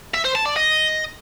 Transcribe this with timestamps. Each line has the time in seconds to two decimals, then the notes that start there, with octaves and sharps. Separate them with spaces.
0.14 E5
0.25 C5
0.35 A5
0.46 D5
0.56 D#5